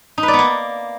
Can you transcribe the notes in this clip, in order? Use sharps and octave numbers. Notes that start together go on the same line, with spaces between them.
D#4
B4
D5
B3
A#3